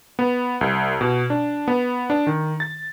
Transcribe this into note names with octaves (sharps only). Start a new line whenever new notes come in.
B3
C2
B2
D4
B3
D4
D#3
A6